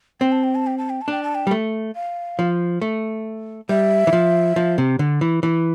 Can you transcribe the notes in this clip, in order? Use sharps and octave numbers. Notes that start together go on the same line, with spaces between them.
C4 G5
A5
G5
A5
G5
A5
G5
A5
D4 G5
A5
G5
G3
A3
F5
F3
A3
G3 E5
E3
F3
F3
C3
D3
E3
E3